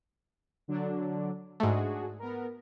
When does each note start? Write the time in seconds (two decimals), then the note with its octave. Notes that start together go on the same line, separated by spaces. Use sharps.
0.68 D3 F#3 D4
1.60 G#2 A3 D4 F#4 G#4
2.19 B3 A#4